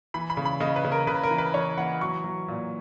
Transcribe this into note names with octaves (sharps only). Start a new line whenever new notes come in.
E3 B5
B5
C#3
B5
C#3 D#5
B4
C#3
A#4
C#3 B4
A#4
E3
B4
E3 C#5
E3 F#5
F#3 C#6
F#3
A#2